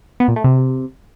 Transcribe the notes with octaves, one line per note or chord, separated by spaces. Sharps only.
B3
A#2
A3
C3